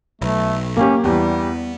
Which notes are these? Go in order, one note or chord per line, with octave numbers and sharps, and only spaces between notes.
B1 A3
A#3 C#4 G4
E2 G3 B3 G4